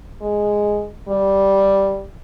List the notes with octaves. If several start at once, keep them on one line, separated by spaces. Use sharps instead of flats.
G#3
G3